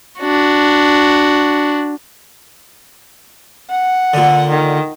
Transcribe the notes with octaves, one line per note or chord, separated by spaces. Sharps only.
D4 F#4
F#5
A#2 D3
D#3